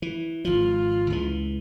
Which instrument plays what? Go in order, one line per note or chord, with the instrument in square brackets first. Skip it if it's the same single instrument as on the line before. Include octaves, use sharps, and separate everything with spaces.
[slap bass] E3
[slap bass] G#1 F3 [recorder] F4
[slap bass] C#2 E3